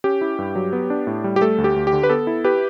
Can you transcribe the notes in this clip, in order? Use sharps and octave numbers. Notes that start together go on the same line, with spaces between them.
C#4 G4
E4
G2
F#3
B3
D4
A2
G3
G4
A3 A4
D2
G4
D2
G4
D3
B4
B3 A4
E4
G4 B4